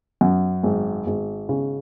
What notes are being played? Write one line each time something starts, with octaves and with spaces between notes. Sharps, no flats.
F#2
G#1
G#1
C#3